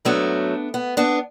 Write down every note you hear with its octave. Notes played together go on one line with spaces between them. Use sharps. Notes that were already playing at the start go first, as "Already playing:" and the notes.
G#2 F#3 A3 B3 D4
B3
B3 D4